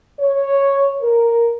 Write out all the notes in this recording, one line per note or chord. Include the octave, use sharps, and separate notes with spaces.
C#5
A#4